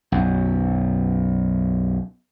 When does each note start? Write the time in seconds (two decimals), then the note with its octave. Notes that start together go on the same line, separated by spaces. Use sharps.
0.12 B1 F#2